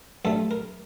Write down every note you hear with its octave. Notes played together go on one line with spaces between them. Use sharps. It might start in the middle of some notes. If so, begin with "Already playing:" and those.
G2 F#3 A3 A4
A#4